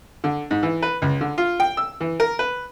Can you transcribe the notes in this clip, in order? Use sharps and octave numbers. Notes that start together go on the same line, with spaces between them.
D3
G#2
E3
B4
C#2
D3
F4
G5
E6
E3
A#4
B4